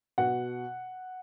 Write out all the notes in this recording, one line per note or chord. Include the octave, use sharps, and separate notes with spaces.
B2 F#5